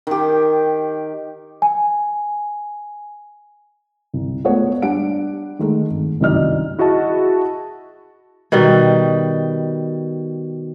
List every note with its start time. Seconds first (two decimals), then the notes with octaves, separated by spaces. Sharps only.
0.07 D#3 G4
1.62 G#5
4.14 C2
4.44 G#3 A3 B3 F4 C#5
4.82 G3 D4 F#5 D7
5.59 D#3 G#3 A3
5.90 G#1
6.20 C2 F#2 D#3 D5 D#5 F6
6.79 E4 F#4 G#4 D#5 A5
8.52 B2 D#3 G3